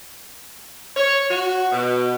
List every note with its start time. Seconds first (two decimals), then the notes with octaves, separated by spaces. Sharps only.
0.96 C#5
1.30 F#4
1.72 B2